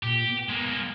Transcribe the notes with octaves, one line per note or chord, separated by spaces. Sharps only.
A#2 G4
B3
G#3 A#3